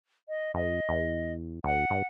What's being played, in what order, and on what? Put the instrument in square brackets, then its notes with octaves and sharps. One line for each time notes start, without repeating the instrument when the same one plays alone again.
[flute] D#5
[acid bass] F2 [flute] D#5
[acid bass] E2
[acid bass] D2 [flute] F#5
[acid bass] G2